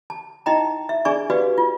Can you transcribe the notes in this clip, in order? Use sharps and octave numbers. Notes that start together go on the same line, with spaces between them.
A5
D#4 E4 D#5 G5 A#5
E5
D4 G#4 D5 G#5 C#6
F#4 G4 B4 D5 F5
F4